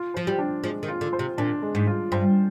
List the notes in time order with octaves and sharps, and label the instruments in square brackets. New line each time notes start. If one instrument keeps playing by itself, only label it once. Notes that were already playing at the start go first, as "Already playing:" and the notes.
Already playing: [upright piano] F4
[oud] F3 [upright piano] C5
[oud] G3
[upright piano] D4
[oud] F3 [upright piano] G#3
[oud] D#3
[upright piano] F4
[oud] D3
[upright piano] C5
[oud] C3
[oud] A#2 [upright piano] D4
[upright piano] G#3
[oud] G#2
[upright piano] F4
[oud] G2 [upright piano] C5